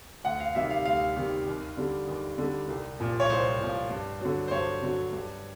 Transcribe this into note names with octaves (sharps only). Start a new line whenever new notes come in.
D2 F#5
F5
C3 D#3 G3 E5
F5
D2 F5
C3 D#3 G3
D#2
D3 G3
D#2
D3 G3
C2
A#2 F3
C#5
C2 C5
A#2 F3
G2
D3 F#3
C5
G2 C#5
D3 F#3
G2